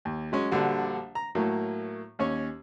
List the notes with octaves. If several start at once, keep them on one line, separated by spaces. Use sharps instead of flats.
D#2
F#3 G#3 C#4
A#1 D3 G3 F#4
A#5
A2 F#3 A#3
D#2 C#4 C#5